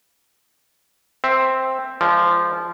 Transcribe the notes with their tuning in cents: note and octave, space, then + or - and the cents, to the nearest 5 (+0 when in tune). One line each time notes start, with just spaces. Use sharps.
C4 +0 E5 +0
F3 -20 G#3 +0 D5 -30